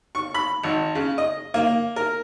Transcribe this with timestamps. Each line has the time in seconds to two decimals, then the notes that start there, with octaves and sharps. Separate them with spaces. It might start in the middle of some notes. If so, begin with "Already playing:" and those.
0.15 C#6
0.34 B5
0.63 G#1
0.95 C#3
1.18 D#5
1.54 A#3
1.96 A#4